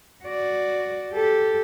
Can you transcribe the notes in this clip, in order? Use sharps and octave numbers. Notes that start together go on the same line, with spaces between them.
F#4 D5
G4 A4